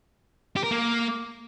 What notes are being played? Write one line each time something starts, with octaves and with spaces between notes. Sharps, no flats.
G4
A#4
A#3